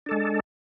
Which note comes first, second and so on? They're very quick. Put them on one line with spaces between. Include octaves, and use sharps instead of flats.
D4 A4 G#3